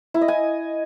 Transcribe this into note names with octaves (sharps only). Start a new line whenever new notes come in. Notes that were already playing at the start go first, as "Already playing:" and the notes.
E4
D#5
G#5